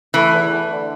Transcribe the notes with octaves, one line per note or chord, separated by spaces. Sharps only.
E3 A3
E2
A3
D3